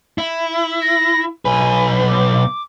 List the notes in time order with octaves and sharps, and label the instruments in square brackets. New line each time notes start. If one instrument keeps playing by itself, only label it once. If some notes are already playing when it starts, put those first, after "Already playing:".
[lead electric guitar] E4
[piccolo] A#6
[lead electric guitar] B1 B4 [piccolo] G#5
[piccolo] D6